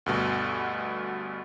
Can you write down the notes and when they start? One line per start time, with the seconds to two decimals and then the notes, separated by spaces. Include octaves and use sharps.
0.06 D2 G2 B2